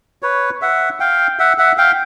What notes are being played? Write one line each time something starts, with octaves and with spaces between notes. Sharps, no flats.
B4 C#5
E5 F#5
F5 G5
E5 F#5
E5 F#5
F5 G5